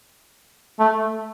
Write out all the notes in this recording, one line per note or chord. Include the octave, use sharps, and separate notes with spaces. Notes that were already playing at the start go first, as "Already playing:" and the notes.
A3